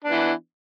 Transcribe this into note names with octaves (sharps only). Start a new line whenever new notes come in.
E3 B3 D4